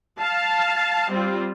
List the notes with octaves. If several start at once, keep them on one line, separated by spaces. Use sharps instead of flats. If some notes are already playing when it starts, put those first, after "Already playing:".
F5 A5
G3 C4 F4